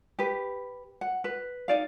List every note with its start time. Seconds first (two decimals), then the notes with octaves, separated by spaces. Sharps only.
0.19 G4 B4
1.01 F#5
1.24 B4
1.68 D#4 D5 F5